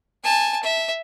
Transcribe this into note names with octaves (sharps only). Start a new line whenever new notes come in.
G#5 A5
E5